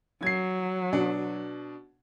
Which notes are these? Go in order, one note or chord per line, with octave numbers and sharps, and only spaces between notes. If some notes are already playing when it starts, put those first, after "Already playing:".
F#3 G#6 C7
B2 D4